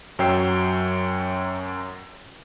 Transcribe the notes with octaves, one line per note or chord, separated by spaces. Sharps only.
F#2 F#3 C#5 G5 E6 C7